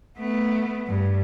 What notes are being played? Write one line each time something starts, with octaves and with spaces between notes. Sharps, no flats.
A3 B3
G2